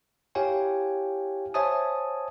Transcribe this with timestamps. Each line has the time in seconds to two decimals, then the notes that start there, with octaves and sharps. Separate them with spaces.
0.35 E4 G4 C#5 F5 G5 G#5
1.54 C5 C#5 E5 G#5 A5 D#6